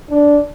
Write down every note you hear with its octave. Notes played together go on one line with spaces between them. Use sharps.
D4